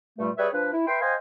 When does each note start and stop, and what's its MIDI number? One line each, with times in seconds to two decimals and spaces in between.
0.19 0.30 43
0.19 0.30 46
0.19 0.30 55
0.19 0.30 57
0.38 0.48 55
0.38 0.48 68
0.38 0.48 71
0.38 0.48 73
0.38 0.48 76
0.53 0.71 53
0.53 0.71 62
0.53 0.71 71
0.74 0.83 64
0.87 1.01 71
0.87 1.01 76
0.87 1.01 79
0.87 1.01 84
1.01 1.14 72
1.01 1.14 75
1.01 1.14 77
1.01 1.14 79
1.01 1.14 80